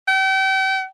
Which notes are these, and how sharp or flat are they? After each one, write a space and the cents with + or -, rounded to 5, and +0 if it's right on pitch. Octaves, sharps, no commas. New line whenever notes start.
G5 -40